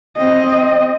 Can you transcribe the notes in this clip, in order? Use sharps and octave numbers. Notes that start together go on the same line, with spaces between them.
C4 D#5